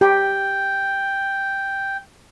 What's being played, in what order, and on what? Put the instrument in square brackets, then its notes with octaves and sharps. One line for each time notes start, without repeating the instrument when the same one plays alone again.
[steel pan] G4 [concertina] G5